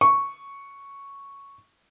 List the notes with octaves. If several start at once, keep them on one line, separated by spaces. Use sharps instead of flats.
C#6